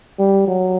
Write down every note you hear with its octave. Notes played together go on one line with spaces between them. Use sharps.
G3
F#3